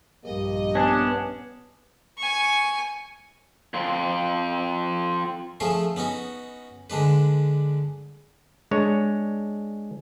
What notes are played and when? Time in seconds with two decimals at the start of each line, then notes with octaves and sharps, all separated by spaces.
0.24 A#1 G2 F3 A#3 G4 D#5
0.75 B3 C#4 D4
2.18 G#5 C#6
3.74 F2 C4
5.60 F3 A3 C#4 G#4 A4
5.96 B3 C#4 D#4 F#4
6.90 D3 G#3 D4 B4
8.71 G#3 D4 C#5